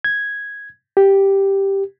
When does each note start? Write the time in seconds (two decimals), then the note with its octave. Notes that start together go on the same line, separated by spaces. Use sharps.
0.04 G#6
0.97 G4